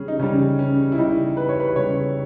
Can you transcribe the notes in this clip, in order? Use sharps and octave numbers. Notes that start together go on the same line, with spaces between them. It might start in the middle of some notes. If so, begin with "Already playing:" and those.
Already playing: C#3 G3 C#4 G#4
D#4
C#3 G3 C#4
C#4
E4
C#3 G3 D#4
B4
C#5
B4
C#3 G3 C#5